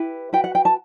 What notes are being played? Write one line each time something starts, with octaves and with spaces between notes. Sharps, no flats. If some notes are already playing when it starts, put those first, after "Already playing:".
Already playing: E4 G4 B4
F#4 B4 G5
F#5
G5
A5